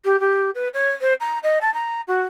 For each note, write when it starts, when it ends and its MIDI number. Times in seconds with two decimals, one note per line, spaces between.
0.05 0.19 67
0.20 0.50 67
0.55 0.68 71
0.74 0.91 73
1.01 1.14 72
1.20 1.39 82
1.43 1.59 75
1.61 1.73 81
1.74 2.01 82
2.07 2.22 66